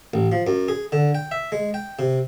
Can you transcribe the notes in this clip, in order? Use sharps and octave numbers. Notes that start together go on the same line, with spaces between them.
A1
F3
F#2
G#4
D3
G5
E5
G#3
G5
C3